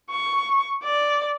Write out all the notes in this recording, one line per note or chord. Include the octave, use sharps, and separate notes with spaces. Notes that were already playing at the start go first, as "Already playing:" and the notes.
C#6
D5